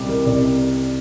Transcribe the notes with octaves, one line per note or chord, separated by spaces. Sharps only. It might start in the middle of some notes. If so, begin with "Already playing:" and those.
Already playing: C2 G3 G4
C3 A#4
C2 D5